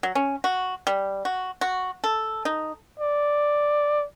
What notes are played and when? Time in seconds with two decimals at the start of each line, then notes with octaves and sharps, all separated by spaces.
0.03 F#3
0.15 C#4
0.44 F#4
0.87 G3
1.25 F#4
1.61 F#4
2.04 A4
2.45 D#4
3.00 D5